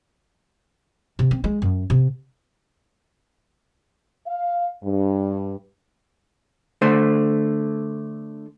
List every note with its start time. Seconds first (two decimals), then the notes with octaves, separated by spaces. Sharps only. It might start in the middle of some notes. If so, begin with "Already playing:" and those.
1.19 C3
1.31 C4
1.44 G#3
1.62 F#2
1.90 C3
4.27 F5
4.83 G2
6.82 D3 A3 C5